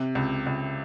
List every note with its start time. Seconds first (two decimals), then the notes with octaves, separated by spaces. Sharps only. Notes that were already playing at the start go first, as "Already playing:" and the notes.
Already playing: C3
0.15 C#2
0.46 C#2